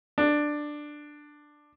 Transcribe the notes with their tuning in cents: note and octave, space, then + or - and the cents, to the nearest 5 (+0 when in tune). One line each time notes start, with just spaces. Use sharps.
D4 +10